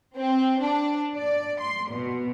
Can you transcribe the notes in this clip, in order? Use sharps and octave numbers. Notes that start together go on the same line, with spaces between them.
C4
D4
D5
C6
B2